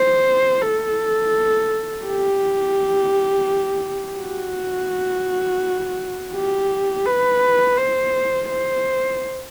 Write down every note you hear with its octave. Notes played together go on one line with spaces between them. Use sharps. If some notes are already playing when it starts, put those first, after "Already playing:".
Already playing: C5
A4
G4
F#4
G4
B4
C5
C5